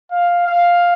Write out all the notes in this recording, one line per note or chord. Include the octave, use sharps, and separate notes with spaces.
F5
F5